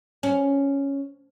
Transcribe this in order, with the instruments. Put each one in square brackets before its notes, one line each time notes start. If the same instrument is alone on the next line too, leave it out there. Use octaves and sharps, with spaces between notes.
[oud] C#4